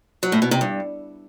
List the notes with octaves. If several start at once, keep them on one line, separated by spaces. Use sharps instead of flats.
F#3
A2
B2
C3
G2